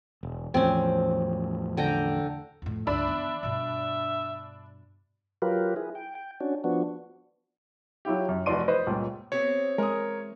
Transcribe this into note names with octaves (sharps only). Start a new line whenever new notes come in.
E1
E2 A2 F3 C4 C#4
D3 G5 A#5
F2 A2
C#2 G2 D4 E5 B5 E6
E3 B3
G2 B2 E5
F#3 F4 G4 A#4 B4
E4 G#4
G5
G5
C#4 D4 F#4
F3 B3 D4 F#4
F#3 E4 F4 G4
F#2
F1 E3 F#4 D5 C6 D#7
B4 C5 D#5
C#2 G2 A#2
B3 C4 G4 C#5
E2 G#3 A#4 D#6